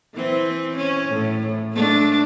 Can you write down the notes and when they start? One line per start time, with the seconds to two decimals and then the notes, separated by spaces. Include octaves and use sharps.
0.15 E3 C4
0.78 C#4
1.10 A2
1.73 A3 D4